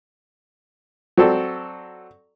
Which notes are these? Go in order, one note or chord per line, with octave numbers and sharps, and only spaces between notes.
F#3 C4 A4 D5